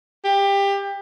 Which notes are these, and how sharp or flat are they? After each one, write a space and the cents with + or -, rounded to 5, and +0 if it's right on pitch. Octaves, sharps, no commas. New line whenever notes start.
G4 +20